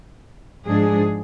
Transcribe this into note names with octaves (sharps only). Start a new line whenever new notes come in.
G#2 F3 G#3 D4 G#4